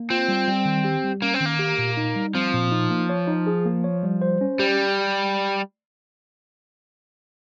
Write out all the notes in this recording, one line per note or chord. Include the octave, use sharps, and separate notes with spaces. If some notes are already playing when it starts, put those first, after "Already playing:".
Already playing: A#3
C4 F4
G3
G3
D#3
G4
G3
A#3 C#4
C4
D#3 A#3
G4
A#2
D#4
G3
F3 C4
A#2
D#4
A#3
C#5
D#4
G#4
A#3
C#5
G3
C5
C#4
G3 G4